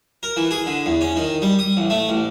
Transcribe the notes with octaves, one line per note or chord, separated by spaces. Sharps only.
A#4
E3
G#4
D3
E2
C#4
D#3
G3
D#6
A1
A3
A1